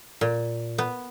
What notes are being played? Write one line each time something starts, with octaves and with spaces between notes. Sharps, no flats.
A#2
B3